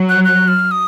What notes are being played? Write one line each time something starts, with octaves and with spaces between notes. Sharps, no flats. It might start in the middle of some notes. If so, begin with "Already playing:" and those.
Already playing: F#3
F#6
F#6
F6
D#6